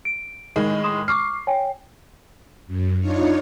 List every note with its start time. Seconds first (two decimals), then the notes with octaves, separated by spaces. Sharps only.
0.05 D7
0.56 A2 D#3 G#3
0.84 C6 D#6 E7
1.08 C#6 D6 F6 C7
1.47 C#5 G5 G#5
2.67 F#2
3.00 D4 D#4 F4 C#5